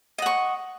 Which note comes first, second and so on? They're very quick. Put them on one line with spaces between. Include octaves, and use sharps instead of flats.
D#5 F#5 C#6